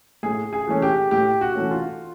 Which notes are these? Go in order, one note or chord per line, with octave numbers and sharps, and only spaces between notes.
A2 G#4
G#4
E3 A3 C#4
G4
A2 G4
F#4
E3 A3 C#4
F4